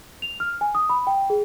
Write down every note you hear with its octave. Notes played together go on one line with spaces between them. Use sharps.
F7
F6
G#5
D#6
B5
G5
G#4